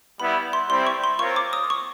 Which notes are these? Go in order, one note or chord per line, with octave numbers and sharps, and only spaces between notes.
G3 B3 E4 B5
C6
G3 C4 E4 C6
C#6
C6
C4 F4 A#4 C#5 C#6
D6
D#6
C#6